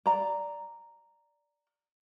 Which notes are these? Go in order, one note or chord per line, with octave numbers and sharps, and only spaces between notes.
D5 A#5